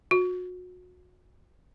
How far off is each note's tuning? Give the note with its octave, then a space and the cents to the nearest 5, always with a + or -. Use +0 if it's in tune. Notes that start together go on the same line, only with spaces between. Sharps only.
F#4 -35